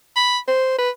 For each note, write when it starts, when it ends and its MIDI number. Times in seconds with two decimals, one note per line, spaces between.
0.16 0.38 83
0.48 0.74 72
0.78 0.89 71